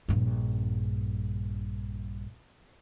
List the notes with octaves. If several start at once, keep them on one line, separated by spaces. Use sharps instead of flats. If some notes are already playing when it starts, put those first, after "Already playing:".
A#1 G2